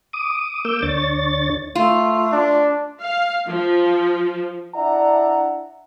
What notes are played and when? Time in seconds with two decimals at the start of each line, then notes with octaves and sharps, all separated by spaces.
0.13 D6 D#6
0.65 A#3 D6 E6 G6
0.82 D2 D4 C#5 A6
1.75 A3 F4
2.33 D4
3.01 F5
3.48 F3
4.75 D4 E4 D5 E5 F#5 A#5